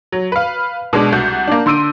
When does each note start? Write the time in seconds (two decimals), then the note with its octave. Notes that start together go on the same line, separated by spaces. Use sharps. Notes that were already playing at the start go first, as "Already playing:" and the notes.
0.12 F#3
0.32 B4 F5
0.93 B2 G#3 D4
1.12 C2 F#4 F#5 G6
1.47 A#3 D4
1.66 D3 C6 E6 D7 D#7